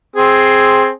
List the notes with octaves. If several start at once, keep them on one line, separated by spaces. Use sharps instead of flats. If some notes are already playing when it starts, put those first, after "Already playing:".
C4 G#4